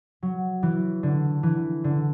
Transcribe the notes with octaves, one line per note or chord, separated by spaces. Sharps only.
F#3
E3
D3
E3
D3